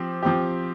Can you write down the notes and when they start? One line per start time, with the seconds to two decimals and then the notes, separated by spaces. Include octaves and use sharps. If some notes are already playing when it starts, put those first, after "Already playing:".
Already playing: F3 C4 G4
0.23 F3 C4 G4